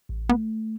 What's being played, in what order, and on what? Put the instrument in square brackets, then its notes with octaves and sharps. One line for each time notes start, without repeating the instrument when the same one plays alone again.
[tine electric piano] A1
[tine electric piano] A3 [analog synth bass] B3